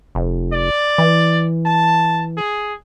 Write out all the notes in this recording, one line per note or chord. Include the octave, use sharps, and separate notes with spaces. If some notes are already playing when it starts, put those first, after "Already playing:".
F1
D5
E3
A5
G#4